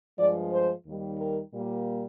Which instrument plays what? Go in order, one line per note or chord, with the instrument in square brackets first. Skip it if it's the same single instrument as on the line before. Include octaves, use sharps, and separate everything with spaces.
[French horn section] G2 F3 G#3 D5
C5
D#2 D#3 G3
A#4
A#2 G3 A#3